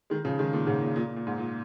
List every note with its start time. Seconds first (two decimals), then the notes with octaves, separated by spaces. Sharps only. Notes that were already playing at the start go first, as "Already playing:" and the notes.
0.10 D#3 G#3
0.25 C#3 F3
0.39 D#3 G#3
0.53 A#2 D#3
0.67 G#2 C#3
0.81 A#2
0.96 A#2
1.16 A#2
1.27 G#2
1.38 A#2